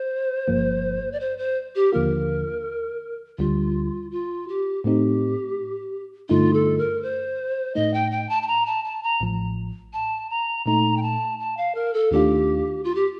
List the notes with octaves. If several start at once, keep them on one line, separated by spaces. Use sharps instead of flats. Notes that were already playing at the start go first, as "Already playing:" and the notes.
Already playing: C5
G1 G2 F3 A#3
D5
C5
C5
G4
D#2 D3 F3 A#3 F4 A#4
D2 D3 G3 F4
F4
G4
A2 A3 C4 D#4 G4
G2 D3 A3 D#4 F4
A4
A#4
C5
A2 A3 D#4 D#5
G5
G5
A5
A5
A#5
A5
A5
A#5
A1 A2 F3
A5
A#5
A#2 A3 D#4 A#5
G5
A5
A5
F5
A#4
A4
D#2 D#3 A3 D4 F4 G4
F4
G4